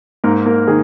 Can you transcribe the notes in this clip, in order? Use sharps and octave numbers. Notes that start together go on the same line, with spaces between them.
G#2 A#3 A#4
A#3 A#4
D#3 G#4